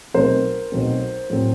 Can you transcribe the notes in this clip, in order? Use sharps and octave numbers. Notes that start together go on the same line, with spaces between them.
B1 B2 F#3 A3 C4 A#4 C5
B1 B2 F#3 A3 C4
A2 F#3 A3 C4